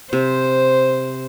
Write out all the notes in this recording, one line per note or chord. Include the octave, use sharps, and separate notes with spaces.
C3 C5